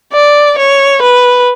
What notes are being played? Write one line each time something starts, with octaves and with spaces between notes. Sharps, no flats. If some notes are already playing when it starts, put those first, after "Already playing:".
D5
C#5
B4